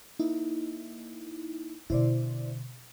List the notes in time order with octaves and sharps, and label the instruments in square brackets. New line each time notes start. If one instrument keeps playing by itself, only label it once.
[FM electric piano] A#3 D#4 E4
[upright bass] B2 D3 [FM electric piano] E4 C5 D5